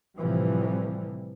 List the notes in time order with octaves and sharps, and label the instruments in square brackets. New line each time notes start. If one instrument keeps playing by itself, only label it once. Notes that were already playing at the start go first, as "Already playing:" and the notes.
[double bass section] A2 C3 E3 F3 G3